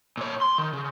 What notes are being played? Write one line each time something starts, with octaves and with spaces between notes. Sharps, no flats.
A#2 C#5
C6
D#3
C#3